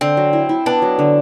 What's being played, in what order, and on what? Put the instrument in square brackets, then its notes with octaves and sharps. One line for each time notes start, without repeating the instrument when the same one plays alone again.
[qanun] D3 [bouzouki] C4
[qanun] F#3
E4
E4
[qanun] B3 [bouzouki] D4
[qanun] F#3
D3